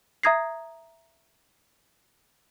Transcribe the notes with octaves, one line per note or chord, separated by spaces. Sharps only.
E5 A#5 D#6 G#6 A#6 C7